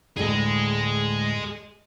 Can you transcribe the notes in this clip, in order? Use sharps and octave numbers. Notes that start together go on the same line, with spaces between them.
D2 A2 G#3 G#4 D#5